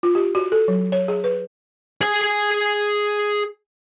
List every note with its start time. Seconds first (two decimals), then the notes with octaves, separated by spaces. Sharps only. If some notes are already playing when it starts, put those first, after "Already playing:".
0.03 F4
0.15 G4
0.35 F#4
0.52 A4
0.68 F#3
0.92 C#5
1.08 G#4
1.24 B4
2.01 G#4 G#5